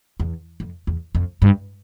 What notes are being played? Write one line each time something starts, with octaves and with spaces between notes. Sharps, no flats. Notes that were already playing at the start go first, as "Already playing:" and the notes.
E2
F2
E2
F2
G2